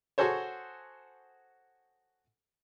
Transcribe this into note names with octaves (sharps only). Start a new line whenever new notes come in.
F#4 G#4 A4 C5 C#5